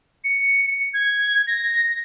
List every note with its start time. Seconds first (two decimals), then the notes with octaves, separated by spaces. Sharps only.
0.24 C#7
0.94 G#6
1.47 A#6